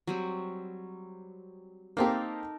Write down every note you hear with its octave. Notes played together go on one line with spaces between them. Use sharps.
F#3 G3 C4
A#3 C4 D#4 G4 A4 A#4